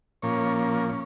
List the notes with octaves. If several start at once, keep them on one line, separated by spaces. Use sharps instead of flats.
A#2 F3 A#3 C#4 C#5
C#4